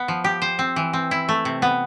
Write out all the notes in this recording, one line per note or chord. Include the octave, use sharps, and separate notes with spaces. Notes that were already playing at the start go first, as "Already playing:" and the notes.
Already playing: B3
F3
G4
C5
C4
E3
C4
E4
A3
C3
B3